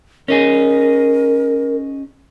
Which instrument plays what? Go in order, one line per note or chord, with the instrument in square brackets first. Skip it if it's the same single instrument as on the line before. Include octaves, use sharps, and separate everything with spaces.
[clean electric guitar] C#4 D#4 G#4 [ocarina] A#4